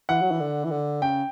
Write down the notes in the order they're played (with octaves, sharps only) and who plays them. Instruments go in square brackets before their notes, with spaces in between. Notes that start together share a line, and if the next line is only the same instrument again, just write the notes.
[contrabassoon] E3 [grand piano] F#5
[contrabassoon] F#3
E3
D3
E3
D3
[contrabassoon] C#3 [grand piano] G5